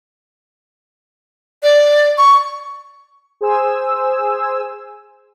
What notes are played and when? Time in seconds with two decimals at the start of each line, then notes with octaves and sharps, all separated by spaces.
1.63 D5
2.18 C#6
3.41 G#4 C5 G#5 E6